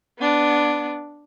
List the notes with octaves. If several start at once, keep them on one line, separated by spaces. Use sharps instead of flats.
B3 D4